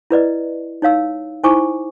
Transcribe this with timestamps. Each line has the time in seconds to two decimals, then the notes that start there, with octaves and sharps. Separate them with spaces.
0.11 E4 B4 D5 D#5
0.82 D#4 C#5 F5 E6
1.43 D#4 E4 C5 G#5 C#6 D6